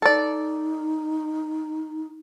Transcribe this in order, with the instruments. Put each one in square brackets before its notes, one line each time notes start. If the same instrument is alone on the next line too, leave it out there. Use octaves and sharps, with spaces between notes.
[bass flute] D#4 [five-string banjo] A4 D5